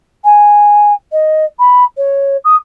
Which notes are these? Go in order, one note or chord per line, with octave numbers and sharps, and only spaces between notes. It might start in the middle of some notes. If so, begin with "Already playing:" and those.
G#5
D#5
B5
C#5
D#6